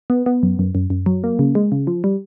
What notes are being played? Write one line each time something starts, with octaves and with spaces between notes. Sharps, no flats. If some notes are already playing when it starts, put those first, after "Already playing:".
B3
B3
F#2
F#2
F#2
F#2
F#3
A#3
C#3
G#3
C#3
F3
G3